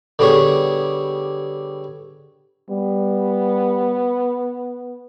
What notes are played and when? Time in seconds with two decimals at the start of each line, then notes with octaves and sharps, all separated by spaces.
0.19 D3 G3 B3 G#4 C#5
2.70 G3 B3